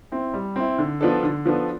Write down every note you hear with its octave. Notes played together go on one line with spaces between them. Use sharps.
C4 E4
G3
C4 E4
D3
F3 B3 D4 A4
D3
F3 B3 D4 A4